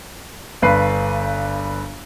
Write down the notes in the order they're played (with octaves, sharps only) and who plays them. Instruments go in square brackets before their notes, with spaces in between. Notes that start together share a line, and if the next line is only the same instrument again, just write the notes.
[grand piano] G1 G2 B4 C7